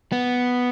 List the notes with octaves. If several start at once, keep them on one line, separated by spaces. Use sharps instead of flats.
B3